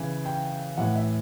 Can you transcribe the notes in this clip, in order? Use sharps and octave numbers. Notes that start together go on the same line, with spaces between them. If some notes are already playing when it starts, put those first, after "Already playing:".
Already playing: C#3 E3
G5
A2 E3 F#5
E5